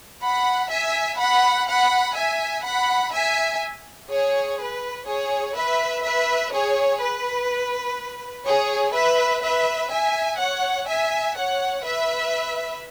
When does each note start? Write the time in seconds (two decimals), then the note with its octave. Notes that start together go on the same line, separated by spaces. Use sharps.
0.22 F#5 B5
0.70 E5 G#5
1.19 F#5 B5
1.68 F#5 B5
2.16 E5 G#5
2.64 F#5 B5
3.13 E5 G#5
4.09 G#4 C#5
4.59 B4
5.06 G#4 C#5
5.56 B4 E5
6.03 B4 E5
6.52 G#4 C#5
7.01 B4
8.46 G#4 C#5
8.94 B4 E5
9.43 B4 E5
9.91 E5 G#5
10.39 C#5 F#5
10.88 E5 G#5
11.36 C#5 F#5
11.85 B4 E5